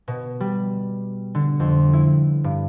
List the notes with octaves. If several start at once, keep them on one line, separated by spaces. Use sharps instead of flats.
B2
G3
D3
F2
E4
G2